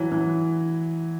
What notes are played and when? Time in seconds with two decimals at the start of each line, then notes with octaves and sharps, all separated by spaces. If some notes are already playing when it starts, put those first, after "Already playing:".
Already playing: E3 F#3
0.12 E3